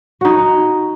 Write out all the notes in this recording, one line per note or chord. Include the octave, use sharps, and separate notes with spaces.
D#4 F#4